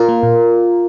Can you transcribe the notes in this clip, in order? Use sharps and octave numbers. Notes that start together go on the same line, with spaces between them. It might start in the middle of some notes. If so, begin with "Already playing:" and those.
Already playing: F4 A#4
A#3
A#2